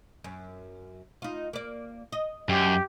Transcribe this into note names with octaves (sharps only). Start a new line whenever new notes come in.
F#2
D#4 F4
A#3 D5
D#5
F#2 G4